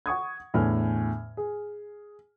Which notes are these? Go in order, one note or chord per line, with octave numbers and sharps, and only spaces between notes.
F#5 C#6 D#6 G#6
E2 A2 D3 G#5 F6
G#4